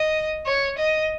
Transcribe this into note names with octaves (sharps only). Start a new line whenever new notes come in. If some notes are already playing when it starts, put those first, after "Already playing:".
Already playing: D#5
C#5
D#5